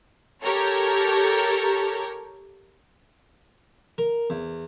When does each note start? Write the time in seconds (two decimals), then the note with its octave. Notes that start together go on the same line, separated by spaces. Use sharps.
0.43 G4 A4 A#4 C#5
3.98 A#4
4.30 E2